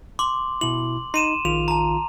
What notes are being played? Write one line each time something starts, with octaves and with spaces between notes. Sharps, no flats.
C6 D6 F#7
B2 E4 F#7
D#4 C6 D#7 E7
A#1 D#3 F4 F7
A5 A#5